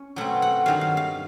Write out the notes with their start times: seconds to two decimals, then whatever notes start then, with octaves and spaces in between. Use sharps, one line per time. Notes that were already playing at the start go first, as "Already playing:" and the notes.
Already playing: C#4
0.16 B2 F#3 A3 C4 F#5
0.42 F#5
0.66 G2 D#3 F#3 F5
0.81 F5
0.97 F5